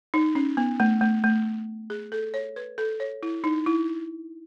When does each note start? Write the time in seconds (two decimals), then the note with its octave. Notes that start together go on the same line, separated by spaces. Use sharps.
0.14 D#4
0.35 C#4
0.57 B3
0.80 A3
1.01 A3
1.24 A3
1.90 G#4
2.12 A4
2.34 C#5
2.56 B4
2.78 A4
3.00 C#5
3.23 E4
3.44 D#4
3.66 E4